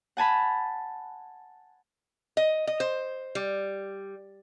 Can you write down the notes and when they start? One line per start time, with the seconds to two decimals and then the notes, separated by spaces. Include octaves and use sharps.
0.17 F#5 G#5 A5 B5
2.37 D#5
2.67 D#5
2.80 C5
3.35 G3